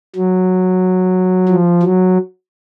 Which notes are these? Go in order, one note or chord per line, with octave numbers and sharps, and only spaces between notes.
F#3
F3
F#3